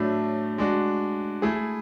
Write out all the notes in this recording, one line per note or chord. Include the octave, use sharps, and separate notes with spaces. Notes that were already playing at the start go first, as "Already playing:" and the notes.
Already playing: A2 F#3 A3 D4
G#3 D4 F#4
A3 E4 G#4